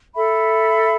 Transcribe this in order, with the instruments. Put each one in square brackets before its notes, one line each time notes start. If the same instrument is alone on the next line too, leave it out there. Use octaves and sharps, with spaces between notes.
[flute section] A4 E5 B5